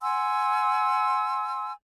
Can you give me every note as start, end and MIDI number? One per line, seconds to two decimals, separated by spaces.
0.01 1.72 78
0.01 1.72 80
0.01 1.72 84
0.01 1.72 88